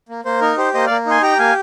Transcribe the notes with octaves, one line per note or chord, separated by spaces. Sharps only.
A#3
A#3 C5
D#4 A#4
G4 C5
A#3 C5 D#5
A#3 D5 F5
D#4 G#5 C6
G4 G5 A#5
A#3 F5 G#5